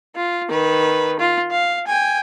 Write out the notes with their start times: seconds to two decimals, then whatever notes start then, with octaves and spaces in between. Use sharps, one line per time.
0.16 F4
0.49 D#3 B4
1.20 F4
1.51 F5
1.87 G5 G#5